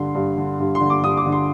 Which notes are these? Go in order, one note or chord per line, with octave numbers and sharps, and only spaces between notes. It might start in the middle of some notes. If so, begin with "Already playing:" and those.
Already playing: G2 D3 C6
G2
D3
G2
C6
D3
D6
G2 D#6
D6
D3
C6